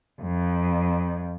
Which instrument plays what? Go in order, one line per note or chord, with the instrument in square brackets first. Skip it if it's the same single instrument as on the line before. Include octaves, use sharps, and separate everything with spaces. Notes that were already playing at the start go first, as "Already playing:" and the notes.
[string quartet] F2